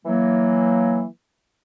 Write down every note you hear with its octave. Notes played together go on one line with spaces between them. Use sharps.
E3 F#3 A#3